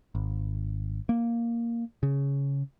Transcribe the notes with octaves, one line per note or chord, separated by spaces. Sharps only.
G#1
A#3
C#3